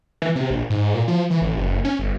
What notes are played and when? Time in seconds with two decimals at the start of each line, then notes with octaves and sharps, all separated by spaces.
0.22 E3
0.35 C3
0.50 A#1
0.70 G#2
0.94 A#2
1.08 F3
1.30 E3
1.42 A1
1.57 F#1
1.85 C#4
1.99 G1